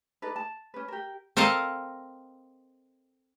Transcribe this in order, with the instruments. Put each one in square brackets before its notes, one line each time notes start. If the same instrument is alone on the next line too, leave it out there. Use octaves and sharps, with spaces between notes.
[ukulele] D4 D#4 A4 B4
A5
C#4 B4
G4 A#4
[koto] C4 A4 A#4 D#5 F5